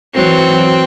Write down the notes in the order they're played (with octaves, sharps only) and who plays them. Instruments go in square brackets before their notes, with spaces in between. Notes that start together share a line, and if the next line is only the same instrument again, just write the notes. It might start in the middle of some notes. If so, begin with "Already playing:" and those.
[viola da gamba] E3 F#3 [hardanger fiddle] C4